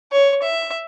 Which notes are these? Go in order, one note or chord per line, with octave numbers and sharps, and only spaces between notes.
C#5
E5